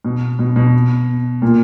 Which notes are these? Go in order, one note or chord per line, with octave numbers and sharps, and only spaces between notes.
B2
B2
B2
A#2